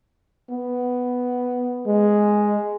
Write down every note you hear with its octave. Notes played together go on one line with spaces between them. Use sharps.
B3
G#3